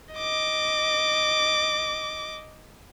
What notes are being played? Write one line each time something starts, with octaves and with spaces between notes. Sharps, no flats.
D#5 D6